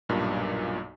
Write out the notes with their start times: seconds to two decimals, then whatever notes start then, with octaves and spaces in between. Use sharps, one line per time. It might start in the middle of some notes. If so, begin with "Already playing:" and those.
0.09 B1 G2 A#2